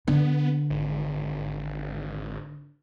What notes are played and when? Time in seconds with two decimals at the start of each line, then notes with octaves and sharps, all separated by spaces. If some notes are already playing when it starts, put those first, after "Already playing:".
0.08 D3 B3
0.70 G#1